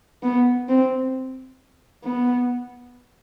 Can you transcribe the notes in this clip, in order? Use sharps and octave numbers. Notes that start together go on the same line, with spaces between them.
B3
C4
B3